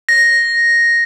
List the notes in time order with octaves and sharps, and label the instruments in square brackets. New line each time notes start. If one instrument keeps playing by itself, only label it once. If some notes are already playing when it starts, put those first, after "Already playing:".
[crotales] A#6